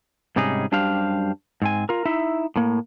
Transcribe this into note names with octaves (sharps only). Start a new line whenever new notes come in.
G#2 C3 G3 C#4 D#4 G#4
F#2 G3 D4 G4 C5 F5
G#2 C4 G#5
F4 A#4
D#4 E4 E5
A2 A#3